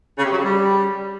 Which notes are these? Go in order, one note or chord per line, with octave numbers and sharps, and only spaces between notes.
C#3
C3
F#3
C#3
G3